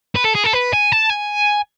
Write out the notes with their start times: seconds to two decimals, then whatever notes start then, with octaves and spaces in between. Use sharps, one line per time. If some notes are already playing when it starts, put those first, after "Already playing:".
0.16 B4
0.25 A4
0.35 G#4
0.44 A4
0.53 B4
0.73 G#5
0.92 A5
1.10 G#5